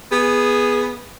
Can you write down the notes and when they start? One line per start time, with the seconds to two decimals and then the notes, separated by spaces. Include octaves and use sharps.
0.12 B3 G#4